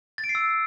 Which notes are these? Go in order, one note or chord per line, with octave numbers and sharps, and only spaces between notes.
A6
D7
C7
E6